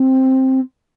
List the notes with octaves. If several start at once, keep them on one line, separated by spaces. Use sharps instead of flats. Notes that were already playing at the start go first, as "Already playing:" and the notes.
Already playing: C4